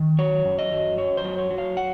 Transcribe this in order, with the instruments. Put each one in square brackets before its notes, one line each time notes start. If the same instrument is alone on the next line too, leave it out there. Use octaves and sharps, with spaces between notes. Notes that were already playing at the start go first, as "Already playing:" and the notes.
Already playing: [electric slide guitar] D#3
F#3 C#5
F#2
D#5
F#3
F#2 C#5
C5
F#3
C#5
F#3
F5
F#5